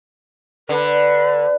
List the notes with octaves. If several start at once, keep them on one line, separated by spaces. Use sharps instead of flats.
D3 B4